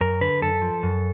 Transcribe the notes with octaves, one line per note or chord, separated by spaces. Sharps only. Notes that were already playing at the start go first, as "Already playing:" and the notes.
F#2 A#4
D3 B4
F#2 A4
F3
F#2